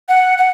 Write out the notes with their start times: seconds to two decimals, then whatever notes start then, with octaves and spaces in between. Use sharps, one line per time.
0.08 F#5
0.38 F#5